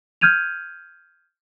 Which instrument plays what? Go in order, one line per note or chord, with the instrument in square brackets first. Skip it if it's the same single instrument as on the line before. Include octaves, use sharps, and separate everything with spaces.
[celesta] F6 G6 G#6 D#7 F7